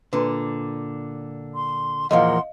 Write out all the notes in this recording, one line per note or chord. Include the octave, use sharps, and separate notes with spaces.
A#2 D3 B4
C6
E2 A#2 F3 A#4 D#5 F5 F#5 C6